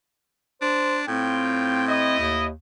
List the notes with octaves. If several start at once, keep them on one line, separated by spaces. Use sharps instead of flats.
D4 C5
A2 C4 F4 G5
E4 D#5
D#2